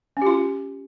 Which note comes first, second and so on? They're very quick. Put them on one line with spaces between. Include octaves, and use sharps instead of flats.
C#4 G4 F4